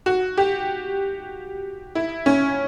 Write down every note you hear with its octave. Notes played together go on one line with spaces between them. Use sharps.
F#4
G4
E4
C#4